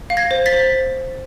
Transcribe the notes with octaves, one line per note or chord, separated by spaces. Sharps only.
F5
G#6 A#6
C5
A6 B6
C5